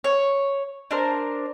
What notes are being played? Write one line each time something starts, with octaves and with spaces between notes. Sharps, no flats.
C#5
D4 A#4 C5